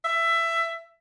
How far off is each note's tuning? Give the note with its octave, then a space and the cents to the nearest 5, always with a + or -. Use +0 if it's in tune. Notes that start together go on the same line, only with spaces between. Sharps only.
E5 +15